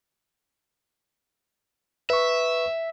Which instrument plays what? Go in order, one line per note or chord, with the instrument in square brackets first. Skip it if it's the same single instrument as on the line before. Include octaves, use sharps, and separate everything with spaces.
[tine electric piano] B4 C#6 [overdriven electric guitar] E5